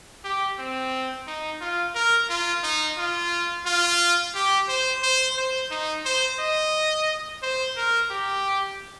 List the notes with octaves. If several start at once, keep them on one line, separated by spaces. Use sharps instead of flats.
G4
C4
D#4
F4
A#4
F4
D#4
F4
F4
G4
C5
C5
C5
D#4
C5
D#5
C5
A#4
G4